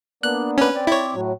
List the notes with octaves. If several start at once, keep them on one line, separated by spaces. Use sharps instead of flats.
A#3 B3 D4 F#6
C#4 B4
C4 D5
E4 C#5
A2 F#3